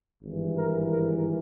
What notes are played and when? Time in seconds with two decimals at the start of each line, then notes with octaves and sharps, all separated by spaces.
0.22 G#1 G2 E3
0.56 A#4
0.89 A#4